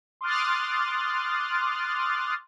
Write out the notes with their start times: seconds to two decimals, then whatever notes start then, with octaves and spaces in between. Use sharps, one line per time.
0.21 C6 D6 D#6 F6 F#6 A6